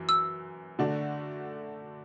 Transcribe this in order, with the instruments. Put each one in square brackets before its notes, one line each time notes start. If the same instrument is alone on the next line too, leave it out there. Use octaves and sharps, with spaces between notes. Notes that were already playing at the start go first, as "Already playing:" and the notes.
Already playing: [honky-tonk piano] F#2 E3
[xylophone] E6
[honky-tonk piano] D3 A3 D4 F#4